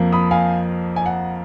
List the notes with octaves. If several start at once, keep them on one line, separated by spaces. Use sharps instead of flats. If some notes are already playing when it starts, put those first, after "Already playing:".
Already playing: F2 F3 A#3
B5 D#6
F5 G#5
G#5
F#5